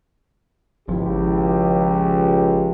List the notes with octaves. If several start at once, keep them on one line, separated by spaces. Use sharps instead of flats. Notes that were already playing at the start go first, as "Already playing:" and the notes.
G#1 C#2 F3 E4 G4